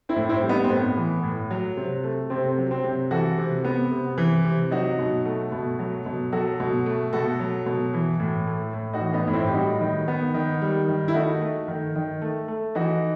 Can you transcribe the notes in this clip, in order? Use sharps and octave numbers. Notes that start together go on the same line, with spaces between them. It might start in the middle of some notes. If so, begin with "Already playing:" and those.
C4 E4
A2
C4 E4
G3
B3 D#4
C4
A2 B3
E3
A2
F#3
C3
A3
C3 C4
F#3
C4
C3
E3 F#4 A4
C3
B3
C3
E3
C3
F#3 D#4 F#4
B2
A3
B2
F#3
B2
F#3 F#4 A4
B2
A3
B2 F#4 A4
F#3
B2
E3
A2
A3
A2
D#4 F#4
E3
B3 D#4
A2
C4 E4
G4
G3 D#4 F#4
D#3
B3
D#3
G3
D#3
E4
A3 D#4 F#4
A3
D#3
D#3
A3
A3
E3 D#4 F#4